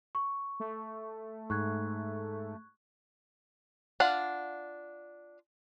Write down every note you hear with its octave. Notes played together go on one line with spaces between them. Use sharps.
C#6
A3
G#2 C#6 F#6 G#6
D4 F4 F5 F#5